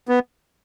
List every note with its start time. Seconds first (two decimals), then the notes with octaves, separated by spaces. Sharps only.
0.09 B3